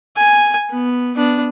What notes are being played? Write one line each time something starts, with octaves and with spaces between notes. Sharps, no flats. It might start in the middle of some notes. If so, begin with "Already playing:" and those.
G#5
B3
B3 D4